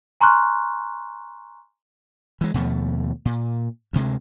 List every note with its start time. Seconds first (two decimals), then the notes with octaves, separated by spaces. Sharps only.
0.21 G#5 A#5 C6 C#6 F6 F#6
2.41 E3 G#3
2.54 D#2 B2 F3 A3
3.25 A#2
3.93 D2 C3 G#3